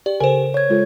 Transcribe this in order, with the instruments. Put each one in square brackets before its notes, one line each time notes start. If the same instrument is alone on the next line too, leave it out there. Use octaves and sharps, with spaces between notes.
[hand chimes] G4 [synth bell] D5
[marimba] C#3 A4 G#5 [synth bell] A#4 C5
[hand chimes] C#5 G#6
[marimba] G#3 F4 A4